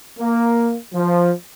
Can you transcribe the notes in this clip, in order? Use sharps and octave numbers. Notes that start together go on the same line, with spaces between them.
A#3
F3